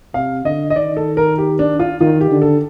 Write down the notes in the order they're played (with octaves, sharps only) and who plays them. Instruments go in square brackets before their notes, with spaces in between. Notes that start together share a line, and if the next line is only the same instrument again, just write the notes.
[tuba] C3 [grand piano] F5
[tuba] D3 [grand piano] D#5
[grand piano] D#5
[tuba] D#3 [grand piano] D5
[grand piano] A4
A#4
G4
D4
F4
[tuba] D#3 [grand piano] F4
[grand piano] G4
[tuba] D3
[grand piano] A4